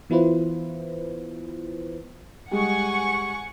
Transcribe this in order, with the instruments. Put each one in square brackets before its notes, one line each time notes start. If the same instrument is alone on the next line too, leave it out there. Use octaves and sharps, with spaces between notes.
[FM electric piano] E3 B3 E4 F4 B4 C5
[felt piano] G3 G#3 [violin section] F#5 G#5 C#6